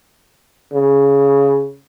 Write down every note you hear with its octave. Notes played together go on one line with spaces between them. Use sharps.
C#3